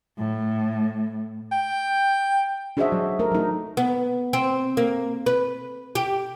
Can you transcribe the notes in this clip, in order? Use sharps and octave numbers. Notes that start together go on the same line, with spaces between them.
A2
G5
D4 F#4 G#4 C5 D#5 E5
F#3
A3 A#4
F#3 D#4
B3
C4
A#3
B4
G4